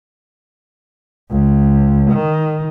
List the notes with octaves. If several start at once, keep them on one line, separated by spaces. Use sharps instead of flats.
C#2
D#3